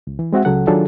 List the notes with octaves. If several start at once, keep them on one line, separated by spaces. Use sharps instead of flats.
C#2
E3
G#3 C4 F#4 E5 F#5
C#2 C#3 F#3 A4 F#5
D#3 F#3 D4 F4 G#4 A4